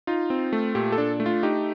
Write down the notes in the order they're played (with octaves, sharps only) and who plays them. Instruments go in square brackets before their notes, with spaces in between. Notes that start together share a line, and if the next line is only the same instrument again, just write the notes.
[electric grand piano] D#4 F4
C4
A3
A#2 G4
A4
D4
A3
F4
D#4 G4